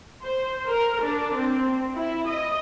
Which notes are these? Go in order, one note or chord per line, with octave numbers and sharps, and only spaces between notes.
C5
A#4
D4
C4
E4
D#5